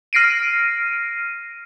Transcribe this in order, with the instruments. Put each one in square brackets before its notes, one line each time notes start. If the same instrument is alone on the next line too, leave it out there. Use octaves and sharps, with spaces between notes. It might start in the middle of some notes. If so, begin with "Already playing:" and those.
[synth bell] F6 A#6 C7 D7 D#7